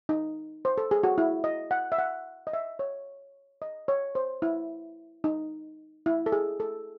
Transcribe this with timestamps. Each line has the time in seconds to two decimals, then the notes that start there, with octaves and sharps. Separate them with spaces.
0.09 D#4
0.65 C5
0.78 A4
0.91 G#4
1.04 F#4
1.18 E4
1.44 D#5
1.71 F#5
1.92 E5
1.98 F#5
2.47 D#5
2.53 E5
2.79 C#5
3.62 D#5
3.88 C#5
4.15 C5
4.42 E4
5.24 D#4
6.06 E4
6.26 A4
6.32 G#4
6.60 A4